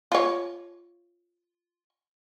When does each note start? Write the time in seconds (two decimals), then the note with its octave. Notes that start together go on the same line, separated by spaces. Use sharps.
0.12 F4 C#5